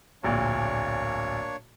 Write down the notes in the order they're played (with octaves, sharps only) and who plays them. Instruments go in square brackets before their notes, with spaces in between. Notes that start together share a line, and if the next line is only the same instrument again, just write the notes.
[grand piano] D1 A#1 A#2 [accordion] A#3 D4 C#5